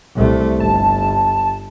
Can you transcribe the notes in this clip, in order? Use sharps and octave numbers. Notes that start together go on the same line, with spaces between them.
C2 A3
G1 A5